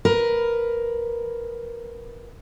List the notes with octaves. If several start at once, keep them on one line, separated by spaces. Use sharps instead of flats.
A#4 B4